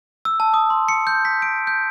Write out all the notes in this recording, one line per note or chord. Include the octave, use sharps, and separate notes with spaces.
E6
A5
D#6
C6
C#7
G6
B6
D7
G6